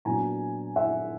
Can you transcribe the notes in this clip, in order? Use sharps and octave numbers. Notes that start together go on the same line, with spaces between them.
A#2 F#3 B3 D4 G#5 A#5
E5 F#5